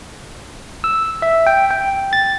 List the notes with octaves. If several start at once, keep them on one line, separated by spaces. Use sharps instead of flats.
E6
E5
G5
G5
A6